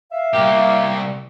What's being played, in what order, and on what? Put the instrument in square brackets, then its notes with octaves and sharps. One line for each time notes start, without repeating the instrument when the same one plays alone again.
[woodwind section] E5 F5
[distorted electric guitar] C2 G4 [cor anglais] A#3